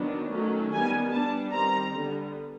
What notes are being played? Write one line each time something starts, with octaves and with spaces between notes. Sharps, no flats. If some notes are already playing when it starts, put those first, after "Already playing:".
Already playing: D#3 F#3 B3 D4
D#3 F#3 A3 C#4
D#3 G3 B3 G#5
G3 B3 D4 A5
D#3 G3 C4 A#5
D3 G3 B3